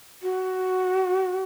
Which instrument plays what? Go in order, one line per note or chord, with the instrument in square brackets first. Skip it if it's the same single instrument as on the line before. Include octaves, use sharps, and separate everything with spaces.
[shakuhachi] F#4